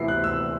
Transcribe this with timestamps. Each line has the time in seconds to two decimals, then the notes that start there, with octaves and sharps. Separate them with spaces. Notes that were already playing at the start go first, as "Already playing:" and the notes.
Already playing: D2 C3 E3 B3 E4 C7
0.08 F#6
0.24 E6